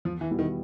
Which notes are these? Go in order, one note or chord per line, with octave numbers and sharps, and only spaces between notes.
E2 F3
E3
B2 G3 B3 E4
D#3